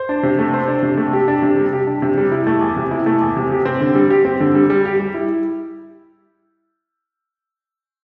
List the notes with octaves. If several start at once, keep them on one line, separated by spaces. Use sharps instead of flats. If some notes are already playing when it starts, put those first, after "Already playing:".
Already playing: C5
D4
C3
A3
C5
D4
C3
A3
G4
D4
C3
G3
G4
D4
C3
G3
E4
A3
E2
C3
E4
A3
E2
C3
G4
C4
D3
G3
G4
C4
D3
G3
G3
G4
G3
E4